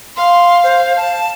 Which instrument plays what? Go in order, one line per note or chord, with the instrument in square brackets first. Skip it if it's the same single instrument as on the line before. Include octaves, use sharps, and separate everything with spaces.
[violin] F5 [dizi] C6
[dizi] C5
A5